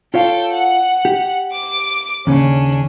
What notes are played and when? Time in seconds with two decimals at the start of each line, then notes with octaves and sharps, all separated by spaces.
0.14 F4 A4 C#5 F5 G5
0.53 F#5
1.05 G4
1.53 D6
2.27 D#2 C#3 C#4 D4